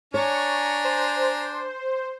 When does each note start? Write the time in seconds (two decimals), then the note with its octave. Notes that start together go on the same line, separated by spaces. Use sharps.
0.14 D4 C#5 G#5 A#5 C#6
0.84 C5